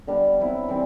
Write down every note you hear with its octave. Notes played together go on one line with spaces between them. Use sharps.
D3 G3 B3 D4
F#3 C4 E4
E3 G3 C4